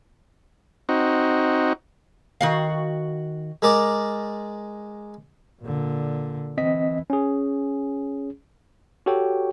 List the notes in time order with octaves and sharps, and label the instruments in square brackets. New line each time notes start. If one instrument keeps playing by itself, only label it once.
[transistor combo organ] C4 D#4 F#4
[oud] D#3 F#4 F5
[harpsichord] G#3 A#4 D5
[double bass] A#2 D3
[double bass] E3 [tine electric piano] C4 D#5 B6
[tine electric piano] C#4 G#4
F#4 G4 A4 C#5 G5